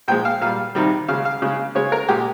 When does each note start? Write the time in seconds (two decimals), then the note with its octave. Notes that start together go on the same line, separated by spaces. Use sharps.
0.08 A#2 F3 G#3 G5
0.25 F5
0.41 A#2 G3 F5
0.75 C3 D#3 G3
1.08 C#3 G#3 F5
1.25 F5
1.42 C#3 G#3
1.75 C#3 G#3 C#5
1.92 A#4
2.08 A#2 G#3 G4